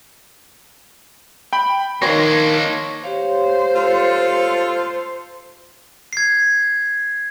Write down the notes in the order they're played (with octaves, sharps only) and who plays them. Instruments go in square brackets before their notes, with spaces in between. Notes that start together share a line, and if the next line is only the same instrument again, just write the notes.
[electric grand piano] G5 B5
[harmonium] D#3 [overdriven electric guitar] A#3 D4 [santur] C#5 G5 C6 [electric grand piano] A#6
[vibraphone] G4 C#5 F5 [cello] C5
[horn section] F4 A4
[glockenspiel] G#6 C7